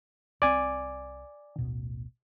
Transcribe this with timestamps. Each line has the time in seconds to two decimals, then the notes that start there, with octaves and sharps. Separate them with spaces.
0.42 C2 C4 D5 G#5
1.58 A1 D2 B2